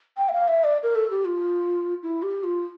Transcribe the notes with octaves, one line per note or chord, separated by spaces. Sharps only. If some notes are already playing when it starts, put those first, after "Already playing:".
G5
E5
F5
E5
D5
A#4
A4
G4
F4
E4
G4
F4